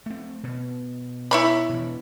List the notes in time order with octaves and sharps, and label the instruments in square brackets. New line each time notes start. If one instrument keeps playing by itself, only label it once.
[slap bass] A3 C4
B2
[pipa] E4 C#5 B5
[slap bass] B2 E3